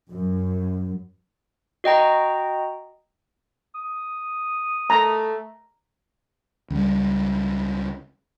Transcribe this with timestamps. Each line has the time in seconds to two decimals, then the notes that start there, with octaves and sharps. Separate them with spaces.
0.11 F#2
1.84 F#4 D#5 G5 A#5
3.75 D#6
4.90 A3 A#5
6.70 C#2 G3